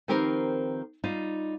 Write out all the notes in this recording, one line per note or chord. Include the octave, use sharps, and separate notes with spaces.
D#3 F3 C4 G4 A#4 B4
G3 D#4 F4